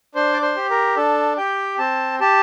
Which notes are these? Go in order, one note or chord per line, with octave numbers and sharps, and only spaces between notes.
D4 C5
D5
C5
G4
A#4
D4 A4
G4 G5
C4 A5
G4 A5